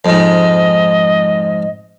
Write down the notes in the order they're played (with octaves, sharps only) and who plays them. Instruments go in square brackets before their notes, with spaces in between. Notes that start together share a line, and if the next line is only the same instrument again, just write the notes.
[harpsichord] F2 G#2 [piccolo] D#5